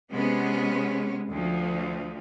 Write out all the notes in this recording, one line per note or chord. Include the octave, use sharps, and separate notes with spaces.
C3 G#3 B3 C#4
D2 F3